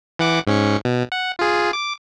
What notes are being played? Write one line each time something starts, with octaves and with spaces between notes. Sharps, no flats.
E3 F#5 D6
G#2 C#4 C#7
B2
F#5
F4 G#4
D6